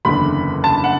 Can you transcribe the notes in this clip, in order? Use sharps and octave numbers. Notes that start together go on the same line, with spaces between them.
F#1 E2 D3 B5
A5
F#5